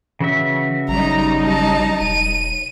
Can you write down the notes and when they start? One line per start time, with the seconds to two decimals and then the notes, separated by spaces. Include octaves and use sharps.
0.20 C#3 E3 F#4 E5
0.88 G#1 F#3 G3 D#4 A#5
1.45 A5 A#5
2.01 E1 D#7